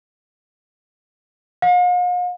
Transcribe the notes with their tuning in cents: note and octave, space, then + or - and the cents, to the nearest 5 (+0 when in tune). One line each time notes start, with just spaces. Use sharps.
F5 +45